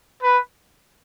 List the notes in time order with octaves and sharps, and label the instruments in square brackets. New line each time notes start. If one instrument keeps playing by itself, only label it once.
[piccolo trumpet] B4